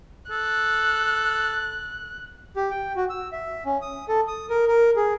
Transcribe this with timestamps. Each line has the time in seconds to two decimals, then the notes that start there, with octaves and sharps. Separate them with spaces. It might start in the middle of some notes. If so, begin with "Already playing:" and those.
0.31 A4 F#6
2.56 G4
2.70 G5
2.96 F#4
3.10 E6
3.32 E5
3.66 C#4
3.82 D#6
4.08 A4
4.28 D#6
4.50 A#4
4.68 A#4
4.96 G#4